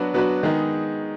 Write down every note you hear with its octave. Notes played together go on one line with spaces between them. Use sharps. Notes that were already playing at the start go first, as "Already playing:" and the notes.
Already playing: F#3 B3 D4 F#4 B4
F#3 B3 D4 F#4 B4
D#3 G#3 B3 D#4 G#4